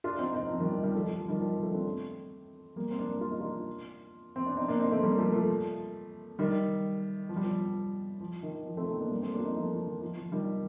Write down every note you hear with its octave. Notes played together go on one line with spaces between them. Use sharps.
D4 F4
C4 D#4
C4 D#4
F3
D#3 G3
F3
D#3 G3
F3 A3
F3
F3
D#3 G3
F3
F3
F3 A3
D4
A3 C4
G3 A#3
C4
A#3 D4
F4
D#4
D4 F4
C4
D4
C4 D#4
A#3 D4
C4 D#4
A3 C4
G3 A#3
F3 A3
F3 A3
D#3 G3
F3
G3
F3
F3
D#3
F3
A3 C4
C4 D#4
A#3 D4
G3 A#3
A3 C4
A#3 D4
F4
C4 D#4
F3 A3
F3
D#3
F3
F3
D#3 G3